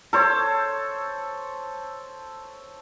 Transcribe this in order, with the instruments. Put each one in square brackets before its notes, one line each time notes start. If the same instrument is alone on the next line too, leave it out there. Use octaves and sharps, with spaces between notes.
[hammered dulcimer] A4 C5 C#5